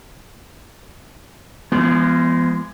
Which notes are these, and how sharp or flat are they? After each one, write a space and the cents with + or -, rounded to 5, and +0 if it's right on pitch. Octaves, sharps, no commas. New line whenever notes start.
F3 -45 G#3 +0 B3 -5